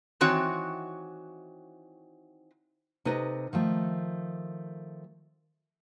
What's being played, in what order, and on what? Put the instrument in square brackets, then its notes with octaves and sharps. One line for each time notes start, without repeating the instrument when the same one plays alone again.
[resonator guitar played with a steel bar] D#3 E3 C4 F#4 C#5
[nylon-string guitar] C3 D#4 A4 B4 D#5
D#3 F3 A3